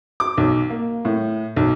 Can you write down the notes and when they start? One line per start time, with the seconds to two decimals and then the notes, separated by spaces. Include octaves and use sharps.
0.20 D6
0.37 B1
0.70 A#3
1.05 A2
1.56 B1